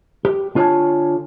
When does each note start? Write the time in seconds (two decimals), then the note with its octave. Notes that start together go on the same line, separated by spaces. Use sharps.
0.25 G4
0.55 D3 F4 C#5 D5 G#5 A5